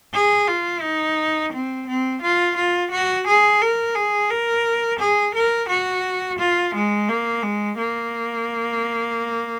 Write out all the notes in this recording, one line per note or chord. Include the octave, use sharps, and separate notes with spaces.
G#4
F4
D#4
C4
C4
F4
F4
F#4
G#4
A#4
G#4
A#4
G#4
A#4
F#4
F4
G#3
A#3
G#3
A#3